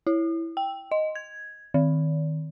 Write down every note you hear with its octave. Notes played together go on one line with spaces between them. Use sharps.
E4
G5
D#5
G#6
D#3